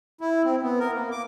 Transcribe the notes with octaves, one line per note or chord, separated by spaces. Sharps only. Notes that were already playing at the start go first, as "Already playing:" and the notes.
E4
C4
B3
A#4
A#3
D6